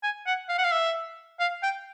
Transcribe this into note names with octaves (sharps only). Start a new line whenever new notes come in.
G#5
F#5
F5
F#5
F5
E5
F5
G5